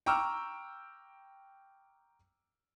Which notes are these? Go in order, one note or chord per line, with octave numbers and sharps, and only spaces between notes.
G5 A#5 C#6 D6 E6 F6